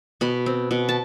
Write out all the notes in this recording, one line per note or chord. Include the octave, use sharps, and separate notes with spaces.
B2 B5
C4
B2
A5